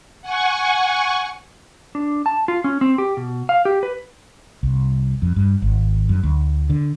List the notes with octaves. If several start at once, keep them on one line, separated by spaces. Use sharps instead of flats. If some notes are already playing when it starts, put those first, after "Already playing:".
F#5 G#5 C#6
D4
A5
F4
C#4
C4
G4
B2
F5
G4
B4
C2
F2
G2
G#1
F#2
D2
D3